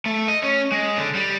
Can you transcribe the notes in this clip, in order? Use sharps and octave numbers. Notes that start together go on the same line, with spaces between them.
A3
D#5
C#4
G#3
D3
G3